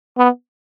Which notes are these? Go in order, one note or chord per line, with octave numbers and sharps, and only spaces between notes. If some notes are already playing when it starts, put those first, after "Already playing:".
B3